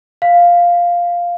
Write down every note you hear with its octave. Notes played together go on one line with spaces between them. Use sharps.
F5